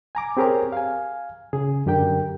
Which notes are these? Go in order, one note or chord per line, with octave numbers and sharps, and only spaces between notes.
G#5 A#5 D6
C4 G4 G#4 A#4 C#5 A#5
F5 G#5
C#3 G#4
F#2 D3 G4 A#4 G5